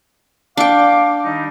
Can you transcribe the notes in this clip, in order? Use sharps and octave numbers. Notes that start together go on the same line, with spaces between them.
D4 F5 G5 D6
D#3 G3 D#4